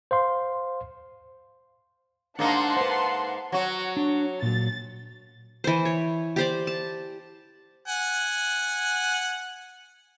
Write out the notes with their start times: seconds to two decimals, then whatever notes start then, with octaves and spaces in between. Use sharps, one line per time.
0.11 C5 F5 C6
2.39 G#2 A#3 D4 D#4 F#5 A5 C6
2.77 B4 C5
3.52 F#3 F#4 F#5 C#6
3.97 D4 C#5
4.42 A#2 F#3 A6
5.64 E3 C5
5.85 C#5
6.36 G4 C5 D5
6.67 A5
7.88 F#5 G#5